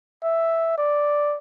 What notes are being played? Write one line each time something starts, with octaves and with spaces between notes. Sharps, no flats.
E5
D5